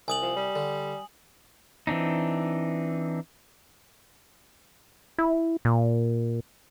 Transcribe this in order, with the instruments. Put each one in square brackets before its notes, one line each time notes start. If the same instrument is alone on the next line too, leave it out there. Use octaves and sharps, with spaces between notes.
[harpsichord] C2 [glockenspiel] G#5 D#6 F#7
[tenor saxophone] F3
G3
[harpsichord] D3
[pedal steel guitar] E3 C4 D4 D#4
[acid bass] E4
A#2